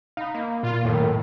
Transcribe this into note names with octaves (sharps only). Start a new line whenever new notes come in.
D#4 F5 B5
A#3
A#2 F4
F#2 A2 D#3